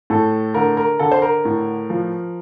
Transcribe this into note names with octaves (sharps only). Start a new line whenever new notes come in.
A2 A4
D3 A#4
A#4
D3 A4
C5
A#4
A2
F3